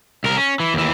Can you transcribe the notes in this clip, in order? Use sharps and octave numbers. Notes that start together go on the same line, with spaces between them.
C2 A#4
C#4
E3
D#2 E3